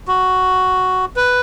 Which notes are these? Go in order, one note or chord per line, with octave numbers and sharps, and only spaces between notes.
F#4
B4